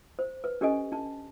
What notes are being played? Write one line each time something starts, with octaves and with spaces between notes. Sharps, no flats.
C5
B4
C#4 D4 G4 A4 D#5 G#5
D4 A5